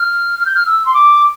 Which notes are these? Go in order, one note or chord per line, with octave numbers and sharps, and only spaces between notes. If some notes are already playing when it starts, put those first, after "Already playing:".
Already playing: F6
F6
G6
F6
E6
C6
D6